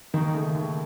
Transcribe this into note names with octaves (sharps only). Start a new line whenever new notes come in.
D#2 D#3
C#3 A3
D#2